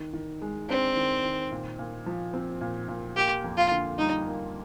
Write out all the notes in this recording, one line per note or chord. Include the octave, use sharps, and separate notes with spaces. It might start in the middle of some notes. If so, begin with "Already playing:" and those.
Already playing: D#3
D#3
G#3
C4 D4
D#3
D#3
A#2
A#2
F3
C4
A#2
A#2
A#3 G4
F2
F4
D3
G3 D#4
A#3